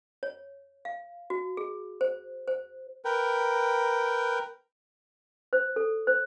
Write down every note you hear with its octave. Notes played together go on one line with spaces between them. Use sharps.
C#5
F5
F#4
G#4
C5
C5
A#4 B4 G5
C5
A4
C5